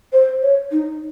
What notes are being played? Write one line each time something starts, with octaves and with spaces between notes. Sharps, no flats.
C5
C#5
D#4